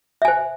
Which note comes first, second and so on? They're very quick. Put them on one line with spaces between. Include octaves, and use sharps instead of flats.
E5 G#5 C5